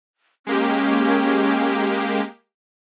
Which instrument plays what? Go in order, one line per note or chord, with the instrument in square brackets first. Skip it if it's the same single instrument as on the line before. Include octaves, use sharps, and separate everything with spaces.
[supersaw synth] G#3 A#3 G4 [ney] C#4